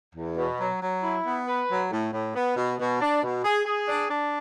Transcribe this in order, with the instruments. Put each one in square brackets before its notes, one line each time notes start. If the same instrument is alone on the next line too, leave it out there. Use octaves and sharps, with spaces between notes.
[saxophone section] E2
B2
F#3
F#3
E4
B3
B4
F#3
A2
A2
B3
B2
B2
D4
B2
G#4
G#4
D4
D4